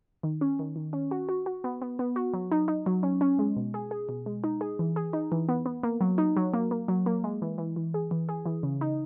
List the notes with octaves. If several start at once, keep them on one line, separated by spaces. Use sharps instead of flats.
D#3
C#4
D#3
D#3
C#4
F#4
F#4
F#4
B3
B3
B3
F#4
F#3
D#4
D#4
F#3
C#4
C#4
G#3
B2
G#4
G#4
B2
G#3
D#4
G#4
E3
G#4
D#4
E3
B3
B3
A#3
F#3
D#4
F#3
A#3
A#3
F#3
A#3
G#3
E3
E3
E3
G#4
E3
G#4
E3
C#3
D#4